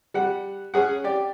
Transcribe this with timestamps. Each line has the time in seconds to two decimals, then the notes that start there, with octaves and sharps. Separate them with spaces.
0.14 G3 F#5
0.74 C#4 G#4 F#5
1.04 G4 D5